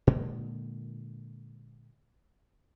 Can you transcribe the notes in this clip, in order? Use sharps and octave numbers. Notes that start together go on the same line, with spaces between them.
A#2 D3 G#3 A#3